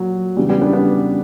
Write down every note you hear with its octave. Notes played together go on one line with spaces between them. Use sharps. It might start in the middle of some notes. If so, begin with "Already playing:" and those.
Already playing: A#2 F#3
E2 C#3 E3 G3
G3 B3
B3 D4
B3 D4